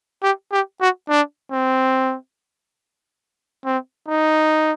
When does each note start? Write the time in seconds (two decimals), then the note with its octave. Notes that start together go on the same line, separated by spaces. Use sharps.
0.23 G4
0.52 G4
0.81 F#4
1.09 D4
1.52 C4
3.65 C4
4.08 D#4